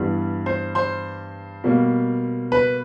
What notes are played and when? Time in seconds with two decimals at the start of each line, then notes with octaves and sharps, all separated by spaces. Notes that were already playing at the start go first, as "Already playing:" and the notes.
Already playing: G2 E3 G3 B3 E4
0.46 C5 C6
0.75 C5 C6
1.64 B2 G3 A#3
2.52 B4 B5